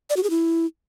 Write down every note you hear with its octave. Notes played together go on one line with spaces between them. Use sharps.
D5
F#4
G#4
E4